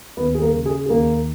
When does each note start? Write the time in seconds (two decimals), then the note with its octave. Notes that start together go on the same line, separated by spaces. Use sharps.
0.17 D#2 B3 B4
0.35 G#4
0.41 A#3 A#4
0.53 C#3
0.66 G#4
0.86 G#4
0.89 D#2 A#3 A#4